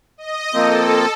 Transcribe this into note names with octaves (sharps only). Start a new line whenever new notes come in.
D#5
F3 A#3 C4 A4